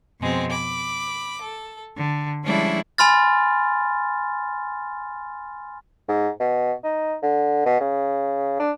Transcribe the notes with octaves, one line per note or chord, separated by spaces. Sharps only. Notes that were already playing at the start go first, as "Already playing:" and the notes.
F2 B2 G#3 C4
B5 D6
A4
D3
F3 G3 G#3 C#4 D4 E4
G#5 B5 C6 F6 A6
G#2
B2
D#4
D3
B2
C#3
D4